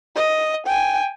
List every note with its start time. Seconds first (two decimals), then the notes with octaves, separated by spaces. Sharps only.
0.16 D#5
0.67 G5 G#5